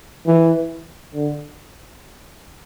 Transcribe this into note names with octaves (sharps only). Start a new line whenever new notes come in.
E3
D3